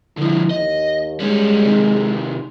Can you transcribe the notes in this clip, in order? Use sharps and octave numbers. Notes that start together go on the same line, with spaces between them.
D3 F3 E4
D#2 D#5
G3 G#3 C#4
C3 D#3